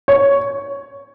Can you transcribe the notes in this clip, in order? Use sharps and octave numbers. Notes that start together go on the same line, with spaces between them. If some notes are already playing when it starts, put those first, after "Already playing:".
C#5